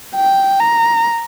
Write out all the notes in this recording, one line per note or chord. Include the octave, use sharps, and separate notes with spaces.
G5
A#5